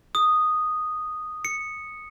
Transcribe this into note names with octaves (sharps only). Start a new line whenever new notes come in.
D#6
C#7